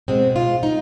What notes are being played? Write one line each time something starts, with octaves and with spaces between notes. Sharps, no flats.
B2 G#3 C4
F4
D#4